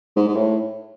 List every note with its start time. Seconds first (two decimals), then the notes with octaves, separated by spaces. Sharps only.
0.16 G#2
0.28 G#2
0.36 A2